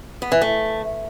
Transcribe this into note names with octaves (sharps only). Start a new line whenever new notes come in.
B3
E3
A3